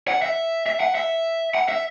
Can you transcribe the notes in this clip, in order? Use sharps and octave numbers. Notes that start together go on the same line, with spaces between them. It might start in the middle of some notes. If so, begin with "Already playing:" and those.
F#5
E5
E5
F#5
E5
F#5
E5